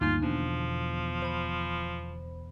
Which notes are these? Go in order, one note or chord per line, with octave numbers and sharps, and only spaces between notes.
D2 G2 D#3 A#3 D#4 F4 G#5
E2 B2 D3 F3 D4
C5 B5